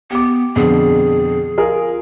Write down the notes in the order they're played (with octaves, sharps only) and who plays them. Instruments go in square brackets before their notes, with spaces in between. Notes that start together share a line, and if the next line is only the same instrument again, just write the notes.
[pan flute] B3 [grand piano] G4 D6
[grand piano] F2 B2 D3 [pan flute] G#4
[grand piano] F4 G#4 A#4